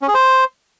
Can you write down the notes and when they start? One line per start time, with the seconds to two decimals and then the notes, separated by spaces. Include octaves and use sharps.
0.02 C#4
0.08 G#4
0.14 C5